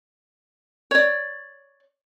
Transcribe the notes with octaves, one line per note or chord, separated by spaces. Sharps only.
C#5 D5